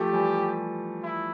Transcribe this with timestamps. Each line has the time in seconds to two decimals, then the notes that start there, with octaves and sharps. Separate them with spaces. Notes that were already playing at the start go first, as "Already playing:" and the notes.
Already playing: F3 A3 G4
0.13 E3 G3
1.03 E4